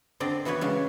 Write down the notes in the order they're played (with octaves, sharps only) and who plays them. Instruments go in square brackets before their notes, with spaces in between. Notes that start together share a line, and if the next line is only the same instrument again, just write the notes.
[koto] D3 C4 D5 D#5
E3 B3 F#4 B4 C#5
C#3 G#3 C#4